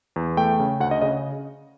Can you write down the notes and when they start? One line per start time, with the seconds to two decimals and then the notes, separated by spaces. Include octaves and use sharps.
0.16 E2
0.37 A3 G5
0.59 C#3
0.80 D2 F#5
0.91 D#5
1.01 C#3 D#5